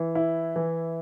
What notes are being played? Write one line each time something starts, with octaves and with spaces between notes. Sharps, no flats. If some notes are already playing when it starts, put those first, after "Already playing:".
Already playing: E3
E4
E3